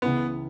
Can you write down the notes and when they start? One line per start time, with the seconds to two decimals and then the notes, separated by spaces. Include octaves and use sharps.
0.02 C#2 C#3 E3 B3 C#4 E4